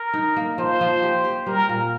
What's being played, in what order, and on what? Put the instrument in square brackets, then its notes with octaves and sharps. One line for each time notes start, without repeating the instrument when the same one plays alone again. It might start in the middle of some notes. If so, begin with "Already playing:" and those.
Already playing: [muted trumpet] A#4
[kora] D#4
A#3
[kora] F3 [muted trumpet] C5
[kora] F3
G4
G4
[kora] G3 [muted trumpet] A#4
[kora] A#2